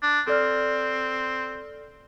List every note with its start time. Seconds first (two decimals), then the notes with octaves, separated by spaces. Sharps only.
0.03 D4
0.27 C4 A4 D5 F6